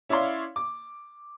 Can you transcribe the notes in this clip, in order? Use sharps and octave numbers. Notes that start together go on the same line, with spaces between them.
C#4 E4 C#5 D5 F5 C6
D6